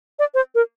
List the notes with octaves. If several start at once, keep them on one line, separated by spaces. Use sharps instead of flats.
D5
C5
A#4